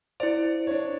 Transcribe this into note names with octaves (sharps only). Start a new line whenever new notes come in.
E4 C5 D5
D4 C#5